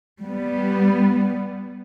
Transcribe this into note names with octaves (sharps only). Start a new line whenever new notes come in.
G3 B3